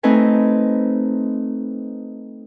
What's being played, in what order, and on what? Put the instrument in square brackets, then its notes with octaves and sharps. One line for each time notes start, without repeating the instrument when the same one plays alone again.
[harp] A3 C4 D#4 B4 G#5